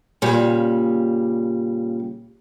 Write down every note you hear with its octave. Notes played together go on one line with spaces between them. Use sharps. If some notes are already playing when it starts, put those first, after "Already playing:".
A#2 C#3 G3